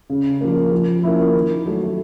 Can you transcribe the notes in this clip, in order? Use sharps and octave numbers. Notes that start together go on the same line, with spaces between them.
C#3
F3 A#3
F3
A#3 C#4 E4
D#3
F#3 A3